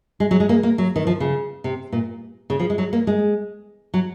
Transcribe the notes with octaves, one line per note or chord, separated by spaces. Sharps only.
G#3
F#3
G#3
A#3
A#3
F#3
D#3
F3
C#3
C3
A#2
C#3
F3
G#3
F#3
A#3
G#3
F#3